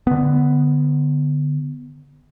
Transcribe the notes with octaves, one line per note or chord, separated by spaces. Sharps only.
D3 B3